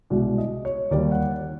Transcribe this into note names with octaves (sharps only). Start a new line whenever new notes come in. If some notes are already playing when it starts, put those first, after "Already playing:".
C2 B2 G#3 D5
D#5
C#5
D#2 D#3 G3 D5
F#5